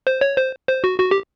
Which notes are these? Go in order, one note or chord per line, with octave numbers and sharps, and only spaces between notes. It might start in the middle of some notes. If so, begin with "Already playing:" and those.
C5
C#5
C5
C5
F#4
F#4
G4